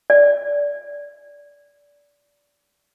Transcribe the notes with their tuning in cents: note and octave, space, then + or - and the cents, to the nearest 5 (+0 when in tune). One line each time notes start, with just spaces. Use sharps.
D5 -20